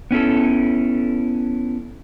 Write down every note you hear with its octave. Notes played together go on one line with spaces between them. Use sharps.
B3 C#4 E4 A4